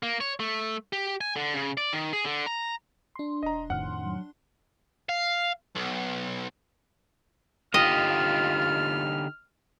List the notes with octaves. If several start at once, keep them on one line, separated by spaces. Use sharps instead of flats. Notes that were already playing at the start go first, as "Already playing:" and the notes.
A#3
C#5
A3
G4
G#5
D3
C#3
D5
D#3
G#4
D3
A#5
D4 C6
E1 D#5 A#5
F2 A2 D#3 F#5 F6
F#3
F5
B1
D3 D#4 F4 G4 D#5 F6